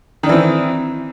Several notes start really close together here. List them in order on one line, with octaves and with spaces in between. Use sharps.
D#3 D4 E3 C4